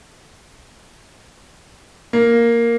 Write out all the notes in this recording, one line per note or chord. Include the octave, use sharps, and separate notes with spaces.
A#3